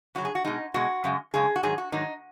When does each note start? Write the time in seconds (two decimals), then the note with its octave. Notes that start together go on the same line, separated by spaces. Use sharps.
0.15 F#2 C#3 F#3 F#4
0.25 G#4
0.35 F#4
0.44 B2 G#3 D#4
0.74 B2 G#3 F#4
1.04 F#2 C#3 G#3
1.34 F#2 C#3 G#3 G#4
1.56 F#4
1.63 G#2 D#3 F#3 G#4
1.78 F#4
1.92 G#2 D#3 F#3 D#4